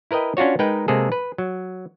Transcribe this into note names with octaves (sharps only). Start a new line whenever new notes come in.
E4 A#4 B4 D#5 G5
C#4 D4 F4 F#4 C#5
G#3 D#4 A#4 B4 G5
C3 G#3 A#3 G#4 A4
B4
F#3